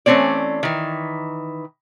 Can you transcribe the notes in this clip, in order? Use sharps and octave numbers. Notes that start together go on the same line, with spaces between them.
E3 A3 C4 C#4 D5
D#3 E3